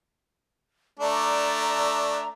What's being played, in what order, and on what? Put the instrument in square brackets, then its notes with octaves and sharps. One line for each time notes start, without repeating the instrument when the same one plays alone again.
[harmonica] A3 D4 [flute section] D5 A#5